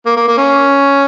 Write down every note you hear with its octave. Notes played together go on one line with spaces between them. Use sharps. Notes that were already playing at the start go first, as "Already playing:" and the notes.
A#3
A#3
A#3
C#4